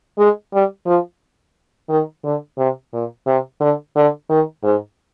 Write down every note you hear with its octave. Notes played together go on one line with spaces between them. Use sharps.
G#3
G3
F3
D#3
D3
C3
A#2
C3
D3
D3
D#3
G#2